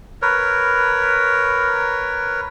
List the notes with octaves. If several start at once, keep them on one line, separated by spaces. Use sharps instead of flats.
A#4 B4 C#5